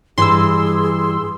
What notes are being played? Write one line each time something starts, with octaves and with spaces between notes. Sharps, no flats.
G2 E3 G#4 C6 E6